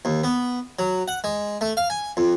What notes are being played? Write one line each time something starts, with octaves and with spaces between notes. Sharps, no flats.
D#2
B3
F#3
F#5
G#3
A3
F5
G#5
F2